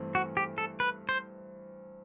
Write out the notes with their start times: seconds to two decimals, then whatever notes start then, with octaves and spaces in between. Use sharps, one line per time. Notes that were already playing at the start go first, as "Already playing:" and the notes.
Already playing: G2 E3 A3 C4
0.15 F#4
0.37 G4
0.58 A4
0.80 B4
1.09 C5